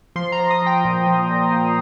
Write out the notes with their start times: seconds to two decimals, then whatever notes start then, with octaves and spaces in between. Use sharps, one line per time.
0.16 F3 C6
0.32 A#5
0.39 F3
0.51 D#6
0.62 F3 G5
0.85 A#2
1.07 F3
1.30 A#2
1.52 A#2